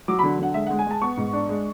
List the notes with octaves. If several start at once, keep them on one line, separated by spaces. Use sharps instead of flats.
F#3 D6
D3 B5
D3 F#5
G#3 E5
G#3 F#5
G#5
G#3 A5
B3 C#6
G#2
D4
G#3